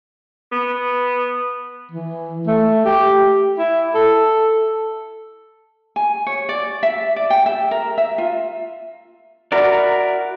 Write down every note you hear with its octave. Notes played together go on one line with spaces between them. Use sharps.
B3
E3
A3
G4
E4
A4
G#5
C#5
D5
E5
D5
G5
E5
A#4
E5
F4
E4 F#4 A#4 D5